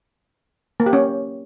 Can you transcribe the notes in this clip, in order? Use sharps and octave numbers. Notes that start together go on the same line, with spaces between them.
A#3
G4
C#4